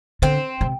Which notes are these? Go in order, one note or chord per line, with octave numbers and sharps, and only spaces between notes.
D3 C4
C3